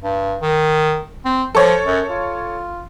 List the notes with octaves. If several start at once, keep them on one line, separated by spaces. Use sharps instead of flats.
G2
D#3
C4
F3 A4 C#5
F#2
F4